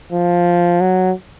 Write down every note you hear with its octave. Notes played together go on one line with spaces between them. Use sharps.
F3
F#3